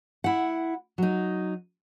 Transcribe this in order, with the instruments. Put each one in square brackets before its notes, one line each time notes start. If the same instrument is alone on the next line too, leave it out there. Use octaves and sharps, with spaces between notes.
[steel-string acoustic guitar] E4 F#5
F#3 D#4